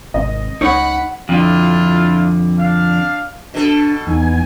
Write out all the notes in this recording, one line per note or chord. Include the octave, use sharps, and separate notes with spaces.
G#1 C3 C4 D#5
C#2 D#4 C#5 F#5 B5
F2 D3 D4 E4 F4
D4 F5
B2 D4 A4
E2 B3 D#4 G#5